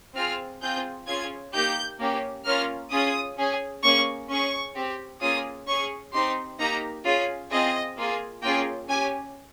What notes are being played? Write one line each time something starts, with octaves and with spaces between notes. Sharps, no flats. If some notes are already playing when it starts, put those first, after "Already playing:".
C4 F4 G#4 F6
C4 F4 G#4 G6
C#4 F4 G#4 G#6
A#3 D#4 G4 G6
A#3 C#4 G4
A#3 C#4 F4 F6
C#4 F4 G#4 D#6
C#4 G#4
A#3 C#4 G#4 C#6
C#4 G#4 C#6
C4 G4
A#3 C#4 F4 G#4 D#6
C#4 G#4 C#6
C4 D#4 G4 C6
A#3 D#4 G4 A#5
C#4 F4 G#4
C4 F4 G#4 D#5
A#3 F4 G#4
A#3 C#4 F4 G#4 G5
C#4 G4 G#5